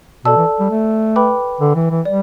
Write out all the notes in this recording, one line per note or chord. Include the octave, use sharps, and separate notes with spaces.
B2 A4 D5 A5 E6
E3
G3
A3
B4 G5 B5 D6
D3
E3
E3
G3 D5